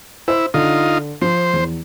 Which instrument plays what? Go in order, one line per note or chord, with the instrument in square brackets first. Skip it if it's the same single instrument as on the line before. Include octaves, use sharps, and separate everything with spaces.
[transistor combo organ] E4 [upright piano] C5
[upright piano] D3 [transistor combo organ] D#4 F4
[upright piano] F3 [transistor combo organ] C5
[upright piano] E2